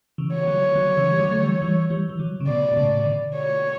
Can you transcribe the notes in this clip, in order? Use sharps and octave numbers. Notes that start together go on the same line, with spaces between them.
C#3 E3
C#5
D3 F#3
D3 F#3
C#3 E3
G3
D3 F#3
A3
E3 G3
E3 G3
E3 G3
E3
D3 F#3
C#3
B2 D5
B2
A2 C#3
B2 D3
C#5